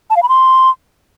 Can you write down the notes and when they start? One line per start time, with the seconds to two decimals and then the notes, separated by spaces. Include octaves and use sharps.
0.10 A5
0.16 F5
0.23 B5
0.29 C6